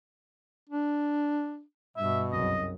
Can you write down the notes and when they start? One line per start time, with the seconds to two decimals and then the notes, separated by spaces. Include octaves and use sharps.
0.69 D4
1.97 G2 B2 E5
2.32 C2 F#2 C#3 D#5